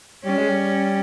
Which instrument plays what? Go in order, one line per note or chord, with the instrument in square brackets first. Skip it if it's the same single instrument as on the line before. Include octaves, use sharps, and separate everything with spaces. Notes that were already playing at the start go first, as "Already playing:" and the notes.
[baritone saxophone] G3 [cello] C#4
[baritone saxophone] G#3
G3